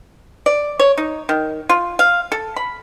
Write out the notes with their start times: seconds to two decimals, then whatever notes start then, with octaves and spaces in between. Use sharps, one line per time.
0.46 D5
0.79 C#5
0.97 D#4
1.29 D#3
1.69 F4
1.99 F5
2.32 A4
2.56 B5